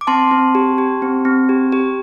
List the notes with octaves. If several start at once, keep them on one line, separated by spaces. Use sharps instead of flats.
D6
C4 A5 C6
C4
G4
G4
C4
C4
G4
G4